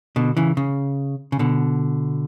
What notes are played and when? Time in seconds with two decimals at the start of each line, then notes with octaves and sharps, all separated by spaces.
0.16 B2 D3
0.37 C#3 E3
0.57 C#3
1.32 C#3
1.39 B2 D3